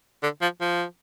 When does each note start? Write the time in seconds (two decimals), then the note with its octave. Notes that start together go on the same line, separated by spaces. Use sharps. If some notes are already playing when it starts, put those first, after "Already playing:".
0.23 D3
0.41 F3
0.61 F3